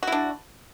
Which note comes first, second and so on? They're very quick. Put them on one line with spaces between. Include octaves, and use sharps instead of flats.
F#4 E4 D4